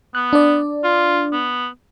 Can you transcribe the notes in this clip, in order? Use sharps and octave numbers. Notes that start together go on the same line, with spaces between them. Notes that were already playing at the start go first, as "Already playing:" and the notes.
B3 F#6
D4 D5
F4
B3